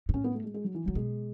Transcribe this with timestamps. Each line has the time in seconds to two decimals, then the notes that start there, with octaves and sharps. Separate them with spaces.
0.09 G#2
0.14 A2 C#4
0.24 B3
0.34 A3
0.44 G#3
0.54 G#3
0.64 F#3
0.74 E3
0.86 C#3 F#3
0.95 B2 G#3